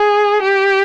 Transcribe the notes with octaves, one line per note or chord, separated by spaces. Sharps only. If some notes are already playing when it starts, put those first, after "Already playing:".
Already playing: G#4
G4